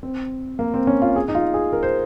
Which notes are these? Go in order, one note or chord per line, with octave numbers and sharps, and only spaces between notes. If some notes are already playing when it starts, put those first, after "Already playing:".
C4
A#3
C4
C#4
F4
G#4
D#4
F4
G#4
A#4
C5